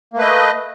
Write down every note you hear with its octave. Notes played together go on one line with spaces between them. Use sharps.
A3 A#3 B4 D#5